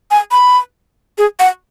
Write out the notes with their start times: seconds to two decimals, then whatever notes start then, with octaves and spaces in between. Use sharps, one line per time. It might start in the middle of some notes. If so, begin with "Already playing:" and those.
0.11 G#5
0.32 B5
1.18 G#4
1.40 F#5